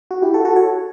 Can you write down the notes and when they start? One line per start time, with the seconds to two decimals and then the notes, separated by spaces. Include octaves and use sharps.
0.11 F#4
0.22 E4 G4
0.34 F#4 A4
0.45 F#4 A4
0.56 A4 C#5